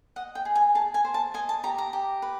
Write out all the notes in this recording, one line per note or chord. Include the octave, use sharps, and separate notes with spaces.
D#5 F#5
G5
G#4
G#5
G#4 A5
G#5
C5
A5
D#5 G#5
A5
G4 A#5
A#5
G4
B4